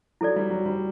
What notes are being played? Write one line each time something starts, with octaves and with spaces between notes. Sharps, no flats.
F#3 E4 A4 D5
G3
F#3
G3